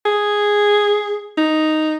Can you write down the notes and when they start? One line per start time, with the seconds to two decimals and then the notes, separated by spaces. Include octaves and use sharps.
0.06 G#4
1.38 D#4